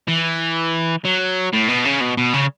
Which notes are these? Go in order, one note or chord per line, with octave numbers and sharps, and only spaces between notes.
E3
F#3
A2
B2
C#3
B2
B2
C#3